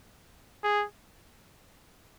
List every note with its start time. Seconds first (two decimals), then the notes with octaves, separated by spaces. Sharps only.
0.64 G#4